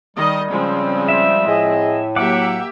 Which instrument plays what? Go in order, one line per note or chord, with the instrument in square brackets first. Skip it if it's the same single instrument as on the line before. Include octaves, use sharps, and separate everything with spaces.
[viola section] D#3 D#5 [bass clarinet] G3
[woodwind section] C#3 C#4 [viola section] F3 G#3 C4
[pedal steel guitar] E5
[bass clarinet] A2 [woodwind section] G#4 D#5
[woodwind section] F#3 [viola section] A#3 G4 E5 [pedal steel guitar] F#5 D6